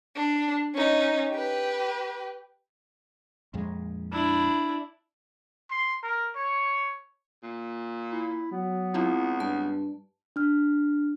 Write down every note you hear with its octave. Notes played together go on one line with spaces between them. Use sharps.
D4
C#4 D#4
G4 B4
A#1 F2 G#3
D4 E4
C6
A#4
C#5
A#2
E4
F#3 B3
C#2 C4 E4 F4
G2 A5
D4 F6